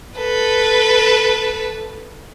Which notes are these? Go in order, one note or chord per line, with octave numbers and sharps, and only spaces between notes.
A4 B4